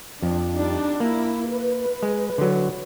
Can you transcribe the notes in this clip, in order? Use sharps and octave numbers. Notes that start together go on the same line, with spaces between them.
F2 D4
G3 D4 D#4
A#3 E4
B4
G#3
D3 F#3